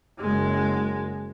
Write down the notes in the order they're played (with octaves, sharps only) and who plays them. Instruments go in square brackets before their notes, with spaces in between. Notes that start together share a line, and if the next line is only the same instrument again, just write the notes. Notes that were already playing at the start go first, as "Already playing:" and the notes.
[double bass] F#1 G#3